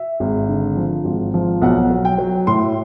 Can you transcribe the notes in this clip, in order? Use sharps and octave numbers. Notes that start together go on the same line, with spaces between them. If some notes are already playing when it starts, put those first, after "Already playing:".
Already playing: E5
G#1
D3
F3
G#1
F3
B1 F#5
F#3
G5
F#3
A2 C6